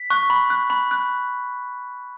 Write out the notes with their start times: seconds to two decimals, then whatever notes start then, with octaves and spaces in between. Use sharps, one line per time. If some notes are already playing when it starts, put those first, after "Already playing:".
Already playing: B6
0.10 C#6 F#6
0.30 B5
0.50 F#6
0.70 B5
0.91 F#6